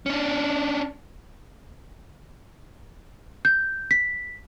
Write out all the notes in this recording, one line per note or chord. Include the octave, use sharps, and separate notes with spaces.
C#4 D4
G6
B6